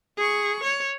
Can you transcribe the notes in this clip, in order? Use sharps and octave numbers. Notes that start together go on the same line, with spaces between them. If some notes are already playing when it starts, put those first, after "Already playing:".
G#4 C#6
C#5